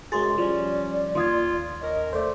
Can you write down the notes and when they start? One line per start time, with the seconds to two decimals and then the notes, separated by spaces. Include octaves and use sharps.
0.12 F#2 C3 G#3 F#4 G#4 C6 A6
0.38 F3 G3 C#4 D5
1.15 D#2 D#3 F4 C6 D#6 G#6
1.81 C#4 A#4 D#5
2.13 A3 A4 C5 D5